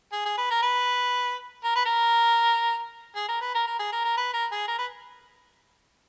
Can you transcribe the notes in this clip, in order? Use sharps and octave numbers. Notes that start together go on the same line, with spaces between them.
G#4
G#4
B4
A#4
B4
A#4
B4
A#4
G#4
A#4
B4
A#4
A#4
G#4
A#4
A#4
B4
A#4
G#4
A#4
B4